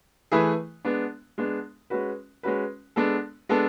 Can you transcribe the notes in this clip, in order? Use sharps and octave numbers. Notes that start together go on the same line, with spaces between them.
E3 A3 E4 G#4 B4
G#3 B3 D4
G#3 B3 D4
G#3 C#4 F#4 B4
G#3 C#4 F#4 B4
G#3 B3 D4 A4
G#3 B3 D4 A4